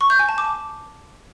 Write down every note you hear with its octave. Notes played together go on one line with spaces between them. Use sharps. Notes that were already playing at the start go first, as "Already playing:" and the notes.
C#6
G6
G#5
A5
D6